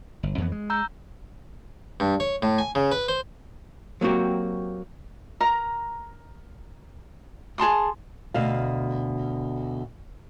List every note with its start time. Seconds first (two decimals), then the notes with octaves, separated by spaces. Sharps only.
0.23 G1
0.38 F2 E3 B3
0.52 G#3
0.70 A#5 E6 G6
2.00 G2
2.20 C#5
2.42 A2
2.58 G#5
2.75 C#3
2.92 B4
3.08 C5
4.01 F#3 A#3 C4 F#4 G4
5.40 A#4 A#5
7.58 G#4 A5 C6 D#6
8.34 D2 B2 F5